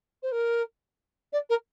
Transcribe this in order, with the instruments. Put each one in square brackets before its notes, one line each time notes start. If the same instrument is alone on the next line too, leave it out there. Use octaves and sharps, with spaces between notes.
[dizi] C5
A#4
D5
A#4